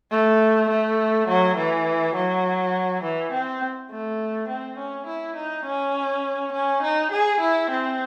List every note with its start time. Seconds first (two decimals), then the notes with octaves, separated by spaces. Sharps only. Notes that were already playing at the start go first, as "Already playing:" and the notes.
0.11 A3
0.70 A3
1.28 F#3
1.57 E3
2.15 F#3
3.03 E3
3.32 C4
3.91 A3
4.48 C4
4.78 C#4
5.07 E4
5.36 D#4
5.65 C#4
6.53 C#4
6.83 D#4
7.12 G#4
7.40 E4
7.70 C4